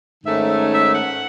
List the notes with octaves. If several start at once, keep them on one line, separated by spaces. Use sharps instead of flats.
G#2 D#3 A3 C#4 E5
E5
E5
F#5